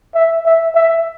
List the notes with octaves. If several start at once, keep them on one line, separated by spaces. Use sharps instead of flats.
E5
E5
E5